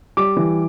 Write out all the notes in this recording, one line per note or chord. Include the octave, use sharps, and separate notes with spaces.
G3 D6
E3